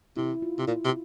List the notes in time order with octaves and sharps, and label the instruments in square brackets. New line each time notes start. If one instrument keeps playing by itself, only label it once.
[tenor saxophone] C3 [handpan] E4
[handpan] F4
[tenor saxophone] C3
[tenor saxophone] A#2 [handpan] E4
[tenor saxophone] C3